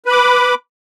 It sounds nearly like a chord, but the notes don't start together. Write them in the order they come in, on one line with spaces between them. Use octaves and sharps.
B4 B5 D6